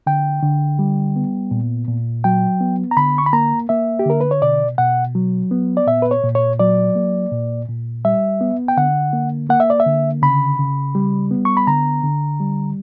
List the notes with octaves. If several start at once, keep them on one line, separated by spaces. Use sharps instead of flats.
D3 G5
D3
G3
B3
A#2
A#2
F#3 G5
B3
A#5
D3 B5
C#6
B5
A#3 A#5
A#3 E5
G4
D3 A#4
B4
C#5
B2 D5
B2 F#5
F#3
B3
D5
A#2 E5
B4
C#5
A#2
C#5
F#3 D5
A#3
A#2
A#2
G3 E5
B3
G5
D3 F#5
A#3
A#3 F#5
E5
D5
E5
D3
C#3 B5
C#3
G3
B3
C#6
B5
D3 A#5
D3
G3